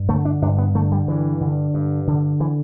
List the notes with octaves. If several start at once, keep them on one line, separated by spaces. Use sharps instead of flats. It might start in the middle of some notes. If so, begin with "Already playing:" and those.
Already playing: G2
D3 A3
D4
G2 D4
B3
D3 A3
G3
G2 E3
D3
G2
D3
E3